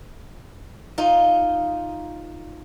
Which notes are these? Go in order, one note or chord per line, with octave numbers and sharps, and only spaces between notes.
D#4 F4